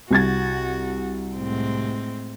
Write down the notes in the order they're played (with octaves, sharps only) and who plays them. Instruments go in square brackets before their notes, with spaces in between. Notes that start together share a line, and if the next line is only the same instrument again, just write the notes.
[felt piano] C2 G#6 A6 [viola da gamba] F#4
[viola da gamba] A2 G#3 C4